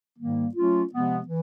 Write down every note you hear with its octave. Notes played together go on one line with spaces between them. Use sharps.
G#2 D#3 G3 A#3
F#3 A3 C#4 F4
C3 F3 G#3 B3
E3